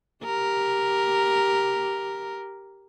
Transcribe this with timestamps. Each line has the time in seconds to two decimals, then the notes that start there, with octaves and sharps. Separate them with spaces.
0.25 G4 A#4